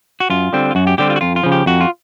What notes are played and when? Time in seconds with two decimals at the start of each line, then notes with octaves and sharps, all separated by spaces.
0.20 F#4
0.30 F#2 F4
0.53 D3 G3 C4
0.71 F4
0.75 F#2 F#4
0.87 G4
0.98 D3 G3 C4 G4
1.10 F4
1.16 F#4
1.21 F2 F4
1.36 F4
1.43 C#3 F3
1.52 G4
1.66 F2 F#4
1.81 F4